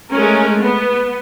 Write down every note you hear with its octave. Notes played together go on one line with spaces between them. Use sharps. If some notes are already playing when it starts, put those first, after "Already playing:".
G#3 A3 C#4 A#4
B3